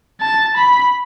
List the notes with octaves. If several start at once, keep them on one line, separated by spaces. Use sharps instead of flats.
A5
B5